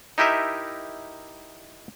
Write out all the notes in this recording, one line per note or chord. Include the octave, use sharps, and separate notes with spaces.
D#4 E4 G4 A#4 D#5 E5